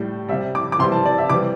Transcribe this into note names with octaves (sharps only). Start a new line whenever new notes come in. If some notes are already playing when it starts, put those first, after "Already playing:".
Already playing: A2 G3
C3 G3 E5
D6
D6
C3 E3 G3 C6
A5
D5
E5
C3 E3 G3 D6